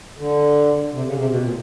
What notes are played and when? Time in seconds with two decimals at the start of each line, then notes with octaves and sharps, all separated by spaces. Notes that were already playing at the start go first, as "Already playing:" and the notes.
0.19 D3
0.93 C3
1.05 C#3
1.17 C3
1.29 B2
1.42 A#2